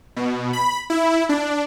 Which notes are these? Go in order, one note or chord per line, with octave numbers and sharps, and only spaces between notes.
B2
B5
E4
D4